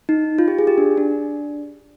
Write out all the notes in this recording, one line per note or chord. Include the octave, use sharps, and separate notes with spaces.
D#4
F4
G4
G#4
G4
D4
D4